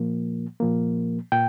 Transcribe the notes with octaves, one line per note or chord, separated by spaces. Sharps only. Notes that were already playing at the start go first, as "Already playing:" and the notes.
Already playing: A#2 F3 A#3
A#2 F3 A#3
A#2 G5